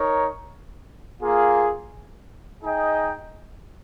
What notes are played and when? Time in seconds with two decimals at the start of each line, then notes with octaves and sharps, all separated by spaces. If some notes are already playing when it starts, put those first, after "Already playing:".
Already playing: D#4 A#4 C#5
1.21 A#3 F4 G#4
2.63 D#4 G#4 D#5 G5